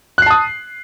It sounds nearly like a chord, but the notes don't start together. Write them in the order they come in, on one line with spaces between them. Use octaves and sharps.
F#6 C7 A5 D#6